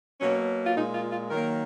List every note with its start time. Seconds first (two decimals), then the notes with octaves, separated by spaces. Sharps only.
0.20 B2 F#3 A#3 C#4
0.66 F4
0.76 A#2 G#3 D#4
0.94 F4
1.12 F4
1.30 D#3 F#3 A#3 A#4